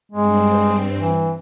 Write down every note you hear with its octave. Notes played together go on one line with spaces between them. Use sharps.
G2 G#3 C4
E3